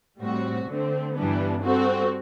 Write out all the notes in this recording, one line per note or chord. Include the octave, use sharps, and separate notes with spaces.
A2 G3 C4 F#4
D3 A3 C4
G2 E3 G3 B3 D4
G3 C4 F#4 A4